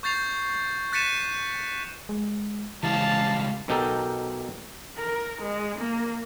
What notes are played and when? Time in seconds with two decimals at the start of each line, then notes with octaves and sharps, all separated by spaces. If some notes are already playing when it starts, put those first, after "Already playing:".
0.03 C#6 G6 A6 C7 F7
0.93 F#6 A6 B6 C#7 D#7 E7
2.09 G#3
2.83 C#3 E3 G3 G#3 F5 A5
3.68 B1 B2 D#4 G4 A4 A#4
4.98 A#4
5.43 G#3
5.79 A#3